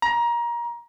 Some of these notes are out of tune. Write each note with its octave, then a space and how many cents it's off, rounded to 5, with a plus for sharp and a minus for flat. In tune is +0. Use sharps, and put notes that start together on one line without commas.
A#5 +25